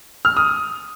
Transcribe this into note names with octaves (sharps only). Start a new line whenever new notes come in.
F6
D#6